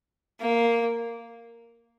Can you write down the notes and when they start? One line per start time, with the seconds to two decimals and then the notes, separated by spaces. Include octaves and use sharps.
0.40 A#3